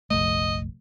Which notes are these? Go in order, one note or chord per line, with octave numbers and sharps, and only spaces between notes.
F1 A#1 A3 D#5